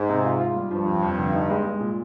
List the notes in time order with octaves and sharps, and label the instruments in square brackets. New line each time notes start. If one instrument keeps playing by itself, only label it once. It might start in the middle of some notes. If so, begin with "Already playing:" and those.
Already playing: [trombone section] G#2
[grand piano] C3
F4
F4
G3
[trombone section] G2 [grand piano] F3
[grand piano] F2
F2
D3
D#4
G#3
G#3
A#2